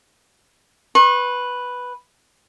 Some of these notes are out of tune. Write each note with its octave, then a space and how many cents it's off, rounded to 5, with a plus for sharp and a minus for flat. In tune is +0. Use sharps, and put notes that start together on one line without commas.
B4 +0 C#6 -45